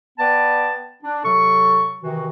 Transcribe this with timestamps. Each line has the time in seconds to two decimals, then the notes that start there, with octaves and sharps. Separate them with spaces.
0.19 B3 B4 D5 G5 A5
1.03 D4
1.24 C3 F#3 A4 C#6
2.02 C3 D#3 E3 F#4